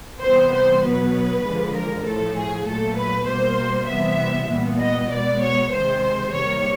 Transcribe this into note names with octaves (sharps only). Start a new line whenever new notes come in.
C3 E3 G3 B3 C5
C5
B2 F#3 B3 B4
D3 F3 G#3
A#4
A2 F3 A3 A4
G#4
A#2 F#3 A3 A4
B4
B2 G3 A#3 C5
C3 E3 G3 B3 E5
A#2 G3 B3
D#5
B2 G#3 B3 D5
C#5
C3 D#3 G#3 C5
C3 D#3 G3 A#3 C#5